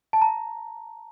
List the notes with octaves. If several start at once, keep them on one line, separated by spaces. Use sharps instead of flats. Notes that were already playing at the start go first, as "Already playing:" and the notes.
A5
A#5